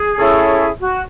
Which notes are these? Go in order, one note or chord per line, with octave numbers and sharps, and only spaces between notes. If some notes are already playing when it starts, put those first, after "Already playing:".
Already playing: G#4
C#4 E4 A4 C#5 E5
F#4